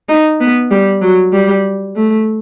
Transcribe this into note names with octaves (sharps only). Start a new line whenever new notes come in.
D#4
B3
G3
F#3
G3
A3